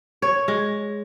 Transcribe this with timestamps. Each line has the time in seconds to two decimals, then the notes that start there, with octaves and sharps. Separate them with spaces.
0.22 C#5
0.48 G#3